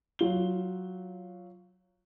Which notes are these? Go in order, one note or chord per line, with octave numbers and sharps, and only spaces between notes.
F#3 F4 G7